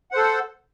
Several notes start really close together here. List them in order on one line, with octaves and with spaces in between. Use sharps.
F#5 C5 A4